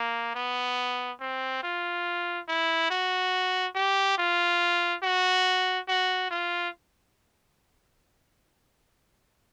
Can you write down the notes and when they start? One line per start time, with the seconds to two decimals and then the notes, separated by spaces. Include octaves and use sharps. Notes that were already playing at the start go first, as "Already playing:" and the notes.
Already playing: A#3
0.35 B3
1.21 C4
1.63 F4
2.48 E4
2.91 F#4
3.75 G4
4.18 F4
5.03 F#4
5.88 F#4
6.31 F4